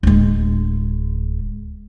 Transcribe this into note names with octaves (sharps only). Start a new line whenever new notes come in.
D1 G#3